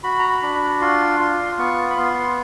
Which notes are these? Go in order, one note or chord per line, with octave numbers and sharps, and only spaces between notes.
F#4 B5
A#5
B5
D4
B5
F4 C6
F4
B3 C#6
B5
B3 C6